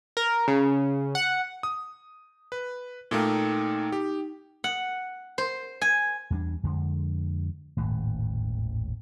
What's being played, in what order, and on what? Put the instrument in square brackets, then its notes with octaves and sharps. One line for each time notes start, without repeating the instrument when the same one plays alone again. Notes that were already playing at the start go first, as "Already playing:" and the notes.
[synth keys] A#4
C#3
F#5
[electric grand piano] D#6
B4
[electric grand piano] A#2 A3 A#3 [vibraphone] D#4 G5
[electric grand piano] G4
[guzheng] F#5
C5
G#5
[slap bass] E2 G3 D4
F2 D3 G#3
D#1 G#1 F#2 A2